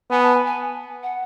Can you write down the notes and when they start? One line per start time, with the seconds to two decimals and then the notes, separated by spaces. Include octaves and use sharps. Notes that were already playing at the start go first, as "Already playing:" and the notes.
0.11 B3 G#5
0.23 A5
0.35 G#5
0.46 G#5
1.03 F#5